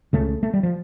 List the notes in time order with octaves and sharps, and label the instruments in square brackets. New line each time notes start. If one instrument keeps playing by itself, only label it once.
[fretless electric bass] C#2 C#3 A3
A3
G3
F3